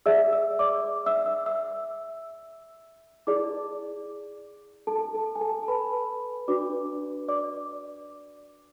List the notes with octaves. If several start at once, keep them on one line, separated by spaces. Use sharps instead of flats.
G#4 D5 E5 E6
E5 E6
D5 D6
E5 E6
E5 E6
E5 E6
E4 G#4 D5 D6
A4 A5
A4 A5
G#5
A4 A5
A5
B4 B5
D4 F#4 B4 D5 D6
D5 D6